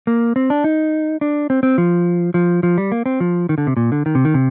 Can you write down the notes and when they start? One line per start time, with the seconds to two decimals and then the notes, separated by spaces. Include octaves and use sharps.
0.07 A#3
0.36 C4
0.50 D4
0.64 D#4
1.21 D4
1.50 C4
1.63 C4
1.78 F3
2.34 F3
2.63 F3
2.78 G3
2.92 A#3
3.06 C4
3.20 F3
3.49 D#3
3.58 D3
3.67 C3
3.77 A#2
3.92 D3
4.06 D#3
4.15 C3
4.25 D#3
4.34 C3